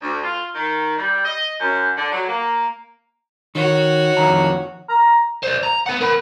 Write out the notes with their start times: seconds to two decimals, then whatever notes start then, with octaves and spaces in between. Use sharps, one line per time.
0.01 D2
0.24 F4
0.55 D#3
0.97 G3
1.25 D#5
1.60 F#2
1.97 D3
2.12 F#3
2.28 A#3
3.55 D#3 F#4 C#5
4.17 F2 D#3 A#5
4.89 A#5
5.43 C5 D5
5.63 A#5
5.86 B4 F#5
6.01 A#4 B5